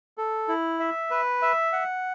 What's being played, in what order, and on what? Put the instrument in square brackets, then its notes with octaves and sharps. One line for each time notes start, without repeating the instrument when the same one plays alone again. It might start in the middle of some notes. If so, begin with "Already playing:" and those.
[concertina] A4
E4
E5
B4
E5
F#5